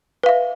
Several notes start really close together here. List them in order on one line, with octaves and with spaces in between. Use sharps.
B4 F5 E5